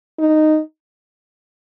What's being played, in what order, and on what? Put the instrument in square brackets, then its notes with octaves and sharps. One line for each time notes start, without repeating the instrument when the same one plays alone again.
[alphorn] D#4